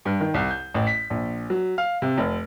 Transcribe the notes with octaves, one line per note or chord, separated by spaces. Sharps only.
G2
D#3
C2
G6
A1
B6
A#1
F#3
F5
C3
F1